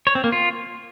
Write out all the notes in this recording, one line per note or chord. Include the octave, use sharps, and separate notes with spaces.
C#5
C4
A#3
F4